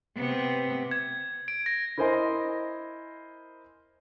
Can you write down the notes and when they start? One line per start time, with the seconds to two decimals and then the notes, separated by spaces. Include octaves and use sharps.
0.17 C3 B3
0.91 G#6
1.48 D7
1.66 A#6
1.98 E4 A#4 C5 D#5 G#5 C6